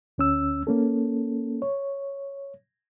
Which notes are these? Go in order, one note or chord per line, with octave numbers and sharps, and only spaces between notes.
D2 C#4 E6
A#3 C#4 A4
C#5